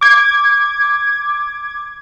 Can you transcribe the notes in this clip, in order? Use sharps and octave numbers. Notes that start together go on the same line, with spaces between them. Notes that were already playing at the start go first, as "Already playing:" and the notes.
D6 G#6